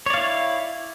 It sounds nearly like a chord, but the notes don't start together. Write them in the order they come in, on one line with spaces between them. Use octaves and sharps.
C#5 D5 F5 E4